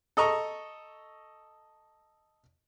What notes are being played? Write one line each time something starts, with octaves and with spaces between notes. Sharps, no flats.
A4 D#5 A#5 C#6